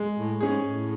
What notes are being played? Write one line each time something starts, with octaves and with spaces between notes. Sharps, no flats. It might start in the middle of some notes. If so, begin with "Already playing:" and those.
Already playing: G#3
A2
G#2 C#4 G#4
A2